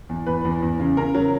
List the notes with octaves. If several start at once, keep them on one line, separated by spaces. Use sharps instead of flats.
E2
E2 B4
E2
E2
C#3
C#3 A#4
F#3